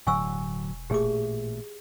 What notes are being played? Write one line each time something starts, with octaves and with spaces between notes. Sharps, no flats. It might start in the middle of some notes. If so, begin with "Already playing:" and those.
E1 A2 D3 F#3 G#5 C#6 E6
A1 A#2 A3 G4 G#4 D6